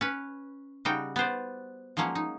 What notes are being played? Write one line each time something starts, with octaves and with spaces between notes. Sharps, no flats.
C#4 B4
C#3 G3 D#4 F#4 G5
B3 B4 C5 D5
F3 F#3 G#3 A#3 C#4
D#4